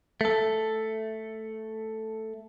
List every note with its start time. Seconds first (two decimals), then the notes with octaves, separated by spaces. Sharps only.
0.21 A3 A4